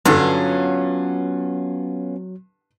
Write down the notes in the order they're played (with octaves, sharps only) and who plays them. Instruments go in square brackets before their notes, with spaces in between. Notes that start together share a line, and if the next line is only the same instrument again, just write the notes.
[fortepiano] G2 D3 [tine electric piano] F#3 [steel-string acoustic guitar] B3 C#4 F4